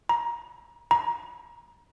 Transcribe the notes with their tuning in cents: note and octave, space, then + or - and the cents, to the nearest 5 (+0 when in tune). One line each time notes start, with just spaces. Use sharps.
A#5 +25
A#5 +30